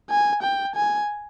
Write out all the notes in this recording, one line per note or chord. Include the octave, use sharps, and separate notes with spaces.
G#5
G5
G#5